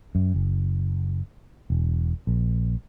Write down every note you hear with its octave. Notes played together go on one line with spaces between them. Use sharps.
F#2
F#1
E1
A#1